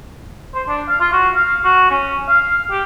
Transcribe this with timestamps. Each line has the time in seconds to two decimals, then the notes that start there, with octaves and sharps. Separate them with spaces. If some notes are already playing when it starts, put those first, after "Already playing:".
0.54 C5
0.68 D4
0.88 F5
1.01 F4
1.13 F#4
1.35 F5
1.64 F#4
1.90 C#4
2.28 F5
2.71 G4